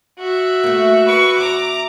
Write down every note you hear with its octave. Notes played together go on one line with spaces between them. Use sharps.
F#4 E5
A3 A#3
B4 C#6
E2 A#5 D6